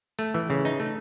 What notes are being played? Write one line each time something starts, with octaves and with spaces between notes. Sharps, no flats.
A3
E3
C#3
D#4
A3